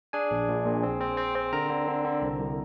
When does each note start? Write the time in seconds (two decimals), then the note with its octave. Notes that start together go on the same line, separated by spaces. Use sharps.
0.13 D4 G#4 G#5
0.31 A#1
0.49 A#1
0.65 A#2
0.83 C4
1.01 C4
1.17 C4
1.35 C4
1.53 D3 A#4 A#5
1.70 D3
1.88 D3
2.05 D3
2.22 C2
2.39 C2